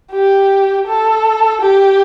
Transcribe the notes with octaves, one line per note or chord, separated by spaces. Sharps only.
G4
A4
G4